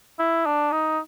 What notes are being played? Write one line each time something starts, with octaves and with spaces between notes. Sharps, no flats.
E4
D4
D#4